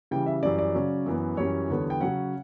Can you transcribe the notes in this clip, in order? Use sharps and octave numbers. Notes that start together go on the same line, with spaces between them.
C#3 E3 G3 G5
E5
F#2 E3 G3 C#4 D5
D5
C#3 F#3 C#4
F#2 E3 B3
F#2 E3 G3 C#4 C#5
E2 D3 G3 B3
G5
C#3 F#3 C#4 F#5